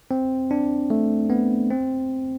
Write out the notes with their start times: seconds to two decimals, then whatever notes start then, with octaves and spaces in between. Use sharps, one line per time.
0.11 C4
0.51 D4
0.90 A3
1.30 B3
1.70 C4